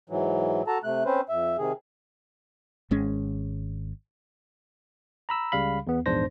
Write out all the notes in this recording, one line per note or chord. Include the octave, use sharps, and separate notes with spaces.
G#2 E3 F#3
F#4 A4 A5 A#5
C3 A3 F#6
C4 C#4 B4 C5
F2 E5
C3 D#3 G#4
G#1 G#3 C#4
A#5 B5 E6
C#2 C#3 G3 F5 B5
E2 B3
A#1 E2 G#2 D4 C5 A#6